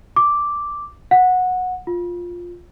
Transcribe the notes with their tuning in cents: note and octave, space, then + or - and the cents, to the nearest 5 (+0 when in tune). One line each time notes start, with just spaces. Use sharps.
D6 -5
F#5 -15
F4 +5